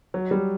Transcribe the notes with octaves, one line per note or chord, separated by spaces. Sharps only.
F#3
G3